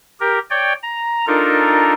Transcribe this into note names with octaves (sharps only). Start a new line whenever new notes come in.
G4 A#4
C#5 D5 G5
A#5
D4 D#4 F4 A4 A#4